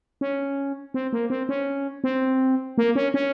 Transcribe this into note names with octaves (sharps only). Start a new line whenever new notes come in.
C#4
C4
A#3
C4
C#4
C4
A#3
C#4
C#4